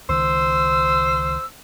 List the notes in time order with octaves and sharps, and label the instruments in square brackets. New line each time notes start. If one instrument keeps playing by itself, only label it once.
[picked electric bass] C#2 D#3 [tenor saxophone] C5 [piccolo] E6